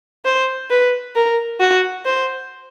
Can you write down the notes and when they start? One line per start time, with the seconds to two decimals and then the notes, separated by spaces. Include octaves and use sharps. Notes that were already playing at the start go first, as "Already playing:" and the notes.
0.25 C5
0.70 B4
1.16 A#4
1.60 F#4
2.05 C5